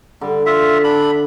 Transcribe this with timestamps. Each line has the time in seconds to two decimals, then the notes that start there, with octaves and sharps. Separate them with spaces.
0.21 D3 G3
0.46 F4 E5
0.84 D4 B5